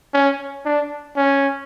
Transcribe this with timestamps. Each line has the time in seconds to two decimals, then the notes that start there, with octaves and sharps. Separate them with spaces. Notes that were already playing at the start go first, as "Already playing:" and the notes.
0.14 C#4
0.65 D4
1.17 C#4